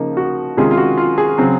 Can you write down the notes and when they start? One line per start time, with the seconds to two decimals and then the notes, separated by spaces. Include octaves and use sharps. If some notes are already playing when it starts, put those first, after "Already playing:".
Already playing: C#3 F3 A#3 D#4
0.17 F#4
0.57 C3 D#3 G#3 C#4 F4 G#4
0.71 F4
0.78 F#4
0.97 F4
1.18 G#4
1.38 C#3 F#3 C4